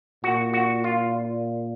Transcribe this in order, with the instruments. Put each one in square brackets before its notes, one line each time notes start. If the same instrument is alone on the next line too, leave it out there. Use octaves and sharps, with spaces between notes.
[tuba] A#2 [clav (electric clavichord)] F#4
[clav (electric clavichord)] F#4
F4